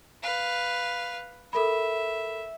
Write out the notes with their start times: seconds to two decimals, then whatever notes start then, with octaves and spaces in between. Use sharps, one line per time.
0.23 B4 F5
1.53 A4 A#4 E5 B5